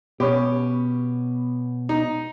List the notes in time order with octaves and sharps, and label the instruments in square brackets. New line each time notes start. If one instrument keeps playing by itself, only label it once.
[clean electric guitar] B2 [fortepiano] C#4 G4
[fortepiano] D#4